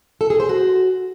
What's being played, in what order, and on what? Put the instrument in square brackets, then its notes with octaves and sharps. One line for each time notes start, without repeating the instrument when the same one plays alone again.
[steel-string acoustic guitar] A4
G#4
C5
F#4